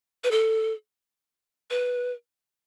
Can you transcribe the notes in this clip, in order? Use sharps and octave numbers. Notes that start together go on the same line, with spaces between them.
B4
A4
B4